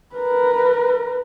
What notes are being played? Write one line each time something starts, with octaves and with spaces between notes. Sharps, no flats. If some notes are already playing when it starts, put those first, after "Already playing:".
A#4 B4